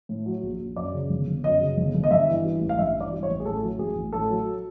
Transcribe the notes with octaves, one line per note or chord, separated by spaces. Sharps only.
A2
F#3
A#1
A#1
F#2 D5
C#3
G1
G1
F#2 D#5
C#3
G1
G1
D#5
G2 E5
E3
G3
A1
F5
G2 E5
E3
D5
G3
C#5
A1
G#4
A2 A4
F#3
A1 G#4
A1
A2 A4
F#3